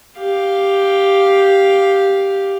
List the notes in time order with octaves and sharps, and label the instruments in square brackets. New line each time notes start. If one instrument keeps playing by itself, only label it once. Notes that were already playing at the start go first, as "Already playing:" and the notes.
[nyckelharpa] G4 F5